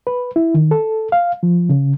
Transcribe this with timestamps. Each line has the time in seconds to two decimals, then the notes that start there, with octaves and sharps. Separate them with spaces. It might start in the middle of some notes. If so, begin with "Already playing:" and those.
0.07 B4
0.36 E4
0.54 D#3
0.71 A4
1.12 F5
1.43 F3
1.69 C#3